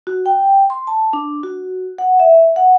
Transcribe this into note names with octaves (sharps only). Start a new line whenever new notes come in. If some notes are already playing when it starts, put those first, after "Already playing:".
F#4
G5
C6
A5
D4
F#4
F#5
E5
F#5